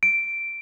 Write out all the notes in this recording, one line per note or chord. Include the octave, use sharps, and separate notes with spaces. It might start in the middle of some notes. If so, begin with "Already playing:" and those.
D7